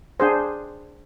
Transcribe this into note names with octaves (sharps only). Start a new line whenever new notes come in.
D4 G#4 C5